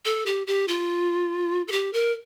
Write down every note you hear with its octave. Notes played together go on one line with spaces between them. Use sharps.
A4
G4
G4
F4
A4
G4
A#4